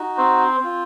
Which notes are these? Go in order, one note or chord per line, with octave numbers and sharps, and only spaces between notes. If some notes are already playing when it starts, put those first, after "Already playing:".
Already playing: D#4 F#4
C4 C5
C4 F4